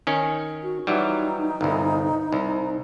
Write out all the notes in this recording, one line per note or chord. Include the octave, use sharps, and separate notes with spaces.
D#3 C#4
F#4
E3 F#3 G3 D#4
G1 C2
C2